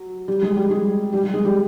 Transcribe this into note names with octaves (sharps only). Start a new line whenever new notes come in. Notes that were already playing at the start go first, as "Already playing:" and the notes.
Already playing: F#3
G3 G4
G#3 G#4
G3 G4
G#3 G#4
G3 G4
G3 G4
G#3 G#4
G3 G4